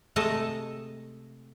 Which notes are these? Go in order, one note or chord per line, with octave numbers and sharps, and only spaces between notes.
C3 G#3 A3 A4 D#5 A5